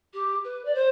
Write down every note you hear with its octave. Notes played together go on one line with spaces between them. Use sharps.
G4
B4
D5
C5